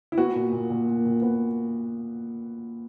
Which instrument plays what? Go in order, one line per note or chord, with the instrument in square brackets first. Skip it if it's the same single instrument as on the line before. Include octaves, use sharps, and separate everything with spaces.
[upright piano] E4
B3 F#4
A#2
A#2
A#2
A#2
A#2
B3